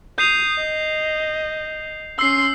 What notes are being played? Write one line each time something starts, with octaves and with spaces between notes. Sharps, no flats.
D#6 G6 C7 F7
D#5
C#4 C6 E6 C7